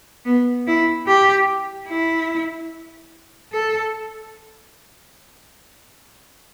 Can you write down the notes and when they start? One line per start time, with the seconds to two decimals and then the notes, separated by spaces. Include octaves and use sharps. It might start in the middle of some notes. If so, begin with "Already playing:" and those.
0.25 B3
0.67 E4
1.07 G4
1.88 E4
3.53 A4